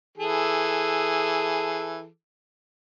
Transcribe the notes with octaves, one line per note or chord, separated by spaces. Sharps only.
E3 G#4 A4